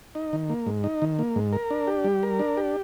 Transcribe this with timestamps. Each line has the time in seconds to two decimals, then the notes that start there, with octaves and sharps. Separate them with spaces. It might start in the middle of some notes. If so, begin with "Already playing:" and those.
0.15 D#4
0.33 D#3
0.50 A#3
0.66 G#2
0.84 D#4
1.02 D#3
1.19 A#3
1.36 G#2
1.53 A#4
1.71 D4
1.87 G4
2.04 G3
2.23 A#4
2.39 D4
2.57 G4